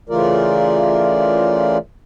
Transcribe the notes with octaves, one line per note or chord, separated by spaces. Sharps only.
C#3 E3 A3 F4 A#4 D5